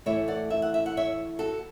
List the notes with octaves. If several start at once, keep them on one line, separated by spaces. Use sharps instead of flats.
A2 E3 A3 C#5 E5
D5 F#5
E5
F#5
E5
F#5
C#5 E5
F#4 A4